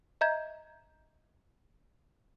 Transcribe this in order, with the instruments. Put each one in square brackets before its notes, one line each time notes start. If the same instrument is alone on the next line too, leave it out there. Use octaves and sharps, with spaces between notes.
[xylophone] D#5 E5 A#5 G6 G#6